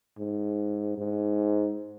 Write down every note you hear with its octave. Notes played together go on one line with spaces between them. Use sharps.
G#2
G#2